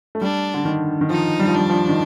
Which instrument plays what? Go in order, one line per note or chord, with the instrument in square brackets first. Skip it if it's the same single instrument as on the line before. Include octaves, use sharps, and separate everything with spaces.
[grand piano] A3
[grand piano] G3 [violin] D4
[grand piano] D3
D#3
D#3
[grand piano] F3 [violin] D#4
[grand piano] G3
F3
[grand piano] G3 [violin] D4
[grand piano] F3
D#3